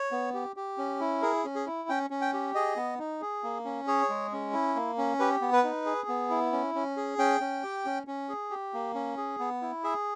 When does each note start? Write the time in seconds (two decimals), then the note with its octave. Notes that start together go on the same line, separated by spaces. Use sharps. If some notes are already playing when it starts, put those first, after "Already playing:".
Already playing: C#5
0.12 B3
0.34 G4
0.56 G4
0.78 C#4
1.00 E4
1.22 G#4 A#4
1.44 C#4
1.55 G#4
1.67 E4
1.89 C#4 G5
2.10 C#4
2.21 G5
2.33 G4
2.55 G#4 D#5
2.76 B3
2.99 D#4
3.21 G#4
3.44 A#3
3.65 C#4
3.87 G#4 C#5
4.09 G#3
4.32 C#4
4.53 E4
4.75 A#3
4.98 C#4
5.19 G4 B4
5.41 B3
5.53 B4
5.64 D#4
5.86 G#4
6.09 B3
6.30 E4
6.52 C#4
6.75 C#4
6.97 G#4
7.18 C#4 G5
7.40 C#4
7.63 G4
7.85 C#4
8.07 C#4
8.29 G#4
8.51 G4
8.74 A#3
8.95 C#4
9.17 G#4
9.39 B3
9.62 E4
9.84 G#4 E5